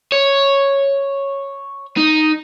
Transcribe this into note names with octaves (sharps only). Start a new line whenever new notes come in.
C#5
D#4